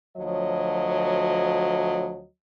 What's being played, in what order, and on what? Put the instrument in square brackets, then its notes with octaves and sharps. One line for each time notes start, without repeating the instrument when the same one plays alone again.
[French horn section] D2 F3 F#3 C#5 D#5